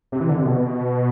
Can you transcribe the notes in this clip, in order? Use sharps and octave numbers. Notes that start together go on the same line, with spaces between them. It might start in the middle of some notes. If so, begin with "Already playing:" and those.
C3
E3
D3
C3
B2